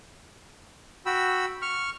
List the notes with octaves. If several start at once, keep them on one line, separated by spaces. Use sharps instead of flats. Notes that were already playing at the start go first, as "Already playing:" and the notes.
F#4 G5 B5 E6
C#6 F6